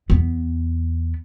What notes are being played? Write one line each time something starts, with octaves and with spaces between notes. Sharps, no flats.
E2 B3